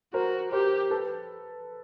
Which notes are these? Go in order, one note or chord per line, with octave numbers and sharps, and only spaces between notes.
F#4 A#4 C5
G4 A#4 C5
A4 B4